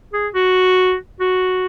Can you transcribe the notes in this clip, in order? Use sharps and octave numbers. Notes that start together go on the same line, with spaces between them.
G#4
F#4
F#4